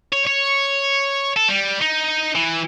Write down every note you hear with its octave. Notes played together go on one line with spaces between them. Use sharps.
C#5
C#5
A4
G3
D#4
E3